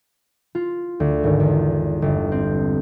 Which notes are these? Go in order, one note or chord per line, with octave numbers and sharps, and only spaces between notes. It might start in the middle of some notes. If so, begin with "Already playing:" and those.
F4
D2
G#1
E2
G1
C4